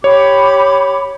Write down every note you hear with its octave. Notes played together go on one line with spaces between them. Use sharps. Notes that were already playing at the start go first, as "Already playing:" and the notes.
G4 C#5 B5 D6